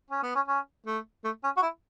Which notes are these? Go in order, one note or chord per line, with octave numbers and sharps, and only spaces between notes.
C#4
B3
C#4
C#4
A3
A3
C#4
F#4
E4